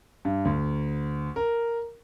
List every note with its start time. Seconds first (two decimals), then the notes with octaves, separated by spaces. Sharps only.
0.25 G2
0.45 D2
1.36 A#4